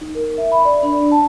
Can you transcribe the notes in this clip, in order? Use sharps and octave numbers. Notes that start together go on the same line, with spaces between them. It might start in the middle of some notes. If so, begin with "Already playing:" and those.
D#4
A#4
E5
B5
D5
D4
A5